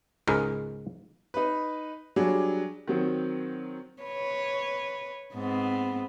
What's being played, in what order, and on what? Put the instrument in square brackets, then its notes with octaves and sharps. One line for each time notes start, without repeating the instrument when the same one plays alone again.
[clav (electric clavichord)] C#2 G#2 G#3 A#4
[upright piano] D#4 B4
F#3 G3 D4 G#4
D#3 F#3 C4
[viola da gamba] B4 C#5
G#2 B3 C4